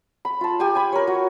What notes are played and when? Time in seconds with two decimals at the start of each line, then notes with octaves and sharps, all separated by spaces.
0.25 B5
0.41 F4 A5
0.59 G4 G5 G#5 D6
0.75 G#5 B5
0.92 A#4 C#5
1.07 F#4